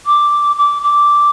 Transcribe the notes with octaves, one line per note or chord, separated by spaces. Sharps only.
D6
D6
D6